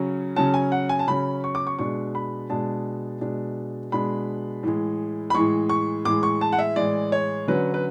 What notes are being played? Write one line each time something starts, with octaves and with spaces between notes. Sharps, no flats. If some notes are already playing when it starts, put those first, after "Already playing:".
Already playing: C#3 F#3 C#4
C#3 F#3 C#4 A5
G#5
F#5
G#5
A5
C#3 F#3 C#4 B5
C#6
D6
C#6
B2 G#3 D4 C#6
B5
B2 G#3 D4 A5
B2 G#3 D4
B2 G#3 D4 B5
A2 E3 G#3
B5
A2 E3 G#3 C#6
C#6
A2 E3 G#3 D6
C#6
A5
F#5
E5
A2 E3 G#3 D5
C#5
D3 F#3 C#4 B4
B4